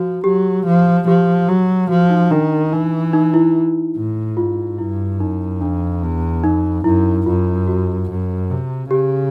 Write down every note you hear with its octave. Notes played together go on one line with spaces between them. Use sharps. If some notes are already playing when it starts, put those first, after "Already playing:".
Already playing: F3 F#4
F#3 G4
F3
F3 G4
F#3 F#4
F3 F#4
D#4
D#3 D4
E3 D#4
D#4
E4
A2
G#2 F4
G2 E4
F#2 D#4
F2 D4
E2
F2 D#4
F#2 E4
F#2 F4
F#4
F#2
C3
C#3 G4